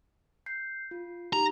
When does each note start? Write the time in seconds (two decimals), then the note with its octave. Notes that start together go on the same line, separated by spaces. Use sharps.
0.46 G6 C7
0.91 F4
1.33 D#4 G4 A#5